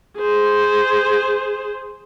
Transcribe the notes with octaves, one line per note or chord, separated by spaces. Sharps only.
G#4 C5